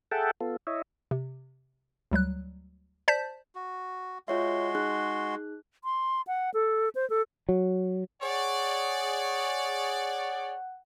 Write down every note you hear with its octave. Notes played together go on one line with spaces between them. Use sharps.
G#4 A4 E5 F#5 G5 A5
B3 F4 A4
E4 C#5 D#5 E5
C3
D2 F#3 G3 F#6
C5 D5 A5 G6 B6
F#4
G#3 F4 F#4 C#5 E5 C6
D#4 G#4 F#6
C6
F#5
A4
C5
A4
F#3
G#4 C#5 D5 F#5